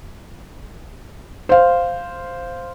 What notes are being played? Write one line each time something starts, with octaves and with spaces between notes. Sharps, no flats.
C5 F5